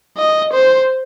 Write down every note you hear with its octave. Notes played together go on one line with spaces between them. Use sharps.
D#5
C5